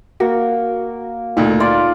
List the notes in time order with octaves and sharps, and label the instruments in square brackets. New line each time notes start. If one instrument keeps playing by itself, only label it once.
[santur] A#3 [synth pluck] F#4
[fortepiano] D2 A#2 [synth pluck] D#4 [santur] A4
[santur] F4 D5